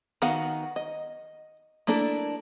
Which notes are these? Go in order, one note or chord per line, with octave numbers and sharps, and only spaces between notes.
D#3 B3 F#4 F5 F#5
D#5
A3 A#3 D4 E4 A4